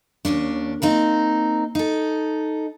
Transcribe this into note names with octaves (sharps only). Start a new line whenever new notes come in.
D#2 G#2 C#4 D4
A#3 C4 D#4
D#4 A4